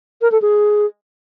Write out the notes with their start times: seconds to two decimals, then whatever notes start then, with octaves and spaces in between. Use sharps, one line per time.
0.21 A#4
0.32 A4
0.42 G#4